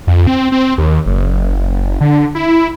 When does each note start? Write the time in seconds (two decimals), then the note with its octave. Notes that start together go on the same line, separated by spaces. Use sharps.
0.07 F2
0.27 C4
0.52 C4
0.78 D#2
1.06 F#1
2.01 D3
2.35 E4